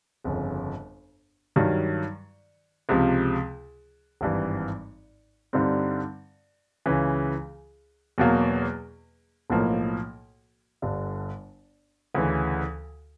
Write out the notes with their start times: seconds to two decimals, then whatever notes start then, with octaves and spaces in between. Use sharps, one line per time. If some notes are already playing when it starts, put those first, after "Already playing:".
0.24 G1 F2 C#3
1.56 G2 D#3 F#3
2.89 C#2 C3 F3
4.21 G#1 G2 E3
5.53 G2 D3 G3 C4 D#4
6.86 C#2 C#3 E3
8.18 E2 B2 F#3 A#3
9.50 B1 A2 F3 A#3
10.82 G1 G2 D3
12.14 D2 C#3 E3